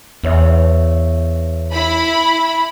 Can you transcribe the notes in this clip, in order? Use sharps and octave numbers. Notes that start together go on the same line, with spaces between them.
E2 B3 C#5 E5
E4 B5